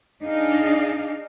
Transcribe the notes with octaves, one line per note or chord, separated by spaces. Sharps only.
D4 D#4 G#4 D#5 F5